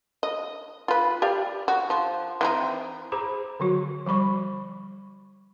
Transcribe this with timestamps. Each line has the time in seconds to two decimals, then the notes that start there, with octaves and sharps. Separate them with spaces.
0.23 D#5
0.88 F4 B4
1.22 G4 D5 F5
1.68 F#4
1.90 F3
2.41 E3 C4 D#4
3.12 G#4 C5 A#5 B5 D6
3.60 D3 F#3 F#4
4.06 F3 G3 B5 C#6